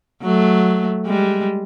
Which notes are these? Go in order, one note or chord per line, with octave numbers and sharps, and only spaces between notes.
F#3 A3
G3 G#3